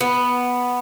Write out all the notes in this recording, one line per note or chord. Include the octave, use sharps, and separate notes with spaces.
B3